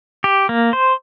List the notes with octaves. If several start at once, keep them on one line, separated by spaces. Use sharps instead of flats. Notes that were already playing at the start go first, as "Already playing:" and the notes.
G4
A#3
C5